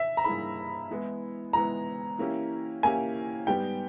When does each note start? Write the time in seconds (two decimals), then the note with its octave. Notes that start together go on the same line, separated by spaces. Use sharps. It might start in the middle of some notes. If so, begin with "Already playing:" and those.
Already playing: E5
0.17 A#5
0.24 G2 E3 A#3 E4 G#4 B5
0.90 E3 G#3 B3 E4
1.53 E3 G#3 B3 E4 A#5
2.18 E3 A#3 C#4 E4 G4
2.83 E3 A#3 C#4 E4 G4 G#5
3.47 G#2 G3 B3 G4 G5